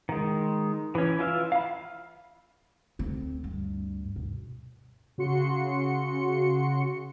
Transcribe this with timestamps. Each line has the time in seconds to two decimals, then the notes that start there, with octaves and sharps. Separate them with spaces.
0.09 D#3 G#3
0.95 E3 C#4
1.19 E3 F4 E5 F6
1.52 F5 B5
2.99 D2 D3 C4
3.44 G2
4.16 B2
5.18 C#3 F#4 C6 C#7